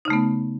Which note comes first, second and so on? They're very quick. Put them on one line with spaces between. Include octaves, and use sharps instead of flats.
D#4 C#3 A3 B3